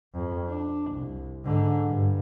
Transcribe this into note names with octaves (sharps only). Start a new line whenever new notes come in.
F2
D4
C2
G#2 D3
G2